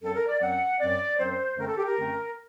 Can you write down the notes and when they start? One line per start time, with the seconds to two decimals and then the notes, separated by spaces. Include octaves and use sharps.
0.02 F#2 F#3 C4 A4
0.15 A#4
0.27 D5
0.41 F#2 F#3 C4 F#5
0.79 F#2 F#3 C4 D5
1.19 F#2 F#3 C4 C5
1.58 F#2 D3 A3 C4 A#4
1.68 A4
1.77 G4
1.87 A#4
1.97 F#2 D3 A3 C4